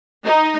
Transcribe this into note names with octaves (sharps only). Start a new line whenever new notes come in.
D#4